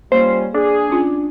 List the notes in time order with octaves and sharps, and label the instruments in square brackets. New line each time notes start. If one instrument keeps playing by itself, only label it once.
[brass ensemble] G3 C#4 F4 [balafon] A#3 [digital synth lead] C5
[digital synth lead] D4 [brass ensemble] G#4
[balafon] C#4 F4